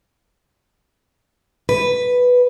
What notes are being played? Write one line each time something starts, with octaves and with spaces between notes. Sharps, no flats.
B4